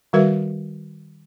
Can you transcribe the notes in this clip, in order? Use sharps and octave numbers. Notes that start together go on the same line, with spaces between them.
D#3 G3 F#4 A#4 B4 E5